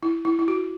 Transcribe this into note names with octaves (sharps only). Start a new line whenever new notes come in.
E4
E4
E4
F#4